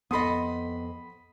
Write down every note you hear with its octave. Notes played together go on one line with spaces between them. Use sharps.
F2 B3 A4 D#5 B5 C6 D#6